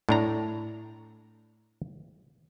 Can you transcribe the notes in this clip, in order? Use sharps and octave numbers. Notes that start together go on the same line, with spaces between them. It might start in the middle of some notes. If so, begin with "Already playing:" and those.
A2 D4 A#5